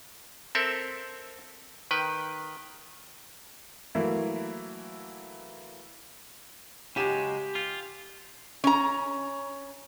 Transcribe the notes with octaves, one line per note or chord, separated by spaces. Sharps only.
C4 A4 A#4 E5
D#3 B4 G5
E3 F#3 A3 A#3 E4
C#3 F#3 G#3 G4 D#7 E7
F4
C#4 A#5